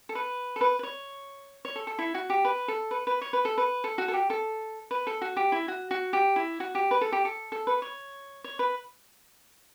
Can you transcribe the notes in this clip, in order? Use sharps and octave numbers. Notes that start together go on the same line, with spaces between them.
A4
B4
A4
B4
B4
C#5
C#5
A4
A4
E4
F#4
G4
B4
A4
B4
B4
C#5
B4
A4
B4
A4
F#4
A4
G4
A4
B4
A4
F#4
G4
E4
F#4
F#4
G4
E4
F#4
G4
B4
A4
G4
A4
A4
B4
C#5
C#5
B4